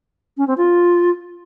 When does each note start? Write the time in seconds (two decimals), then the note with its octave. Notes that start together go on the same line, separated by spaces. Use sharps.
0.37 C#4
0.47 C4
0.57 F4